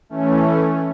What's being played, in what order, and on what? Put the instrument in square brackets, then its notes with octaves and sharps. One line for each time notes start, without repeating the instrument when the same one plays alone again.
[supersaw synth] E3 A3 C#4